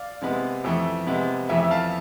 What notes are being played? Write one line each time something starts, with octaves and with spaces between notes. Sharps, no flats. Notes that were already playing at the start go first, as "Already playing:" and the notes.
Already playing: D5 F5
C3 G#3 B3
F2 E3 A3
C3 G#3 B3
F2 E3 A3 E5 G#5
F5 A5